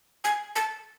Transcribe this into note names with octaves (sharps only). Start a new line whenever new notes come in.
G#5
A5